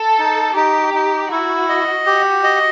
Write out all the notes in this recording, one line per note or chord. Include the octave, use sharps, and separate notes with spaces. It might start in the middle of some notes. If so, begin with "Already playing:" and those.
Already playing: A4
D#4
D#4 G4
D#4
E4 F#4
D#5
F#4 G4
D#5